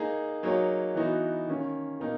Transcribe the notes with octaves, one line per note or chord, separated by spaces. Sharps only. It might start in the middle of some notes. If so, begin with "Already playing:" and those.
Already playing: A#3 D#4 G#4
F#3 A#3 D#4 G#4 C#5
E3 B3 D#4 F#4
D#3 A#3 C#4
B2 A#3 D#4 A#4